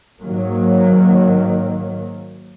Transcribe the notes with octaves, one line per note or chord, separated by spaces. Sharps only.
G#2 D#3 F#3 A#3